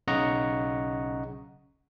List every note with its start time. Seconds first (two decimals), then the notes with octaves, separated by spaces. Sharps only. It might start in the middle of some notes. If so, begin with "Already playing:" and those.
0.08 B1 C#3 D#5 F#5 A#5 C#6